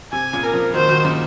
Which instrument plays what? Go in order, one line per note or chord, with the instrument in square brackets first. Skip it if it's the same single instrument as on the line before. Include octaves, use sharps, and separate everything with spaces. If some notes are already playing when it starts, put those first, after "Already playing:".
[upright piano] C3 [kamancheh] G#5
[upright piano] A#2 C#3
[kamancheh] A#4
[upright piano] C#3 F3
[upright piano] D#3 F#3 [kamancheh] C5
[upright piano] D#3 F#3
A#2 C#3